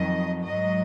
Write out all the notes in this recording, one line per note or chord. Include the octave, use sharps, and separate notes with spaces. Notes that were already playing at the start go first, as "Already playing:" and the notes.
Already playing: F2 D#3 F#3 D#5
G#2 F#3 D#5